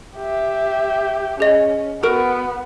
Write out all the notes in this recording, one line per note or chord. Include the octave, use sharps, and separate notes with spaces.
G4 E5
C#4 G#4 D#5
B3 F#4 A#4